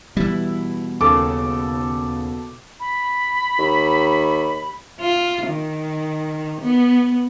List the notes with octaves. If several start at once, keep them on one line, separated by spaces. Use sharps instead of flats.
B2 E3 G3 E4
D#2 C#3 A4 D6
B5
D#2
F4
D#3
B3